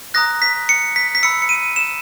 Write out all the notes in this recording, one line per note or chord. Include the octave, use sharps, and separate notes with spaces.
A#5 D#6 F#6 A#6
B6
C#7
B6
B6
B5 E6 C#7
C#7
D#7
E7